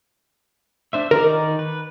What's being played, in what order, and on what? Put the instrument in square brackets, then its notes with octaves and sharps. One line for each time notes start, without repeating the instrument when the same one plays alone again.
[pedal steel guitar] D4 C5 E5
[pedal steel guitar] D#3 D#4 D5 [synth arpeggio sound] A#4
[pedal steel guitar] B4